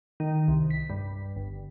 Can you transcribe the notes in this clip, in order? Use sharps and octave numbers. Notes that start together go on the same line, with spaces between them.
D#3
C2
B6
G2
G1